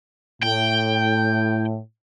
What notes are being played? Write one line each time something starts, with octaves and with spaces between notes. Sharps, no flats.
A2 G5